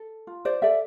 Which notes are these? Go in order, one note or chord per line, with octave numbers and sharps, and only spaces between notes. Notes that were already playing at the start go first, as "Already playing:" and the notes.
Already playing: A4
F4
C5 D5
A4 D5 E5